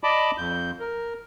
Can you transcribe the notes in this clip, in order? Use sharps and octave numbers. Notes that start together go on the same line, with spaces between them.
D5 D#5 A5 B5 D6
F2 G6
A#4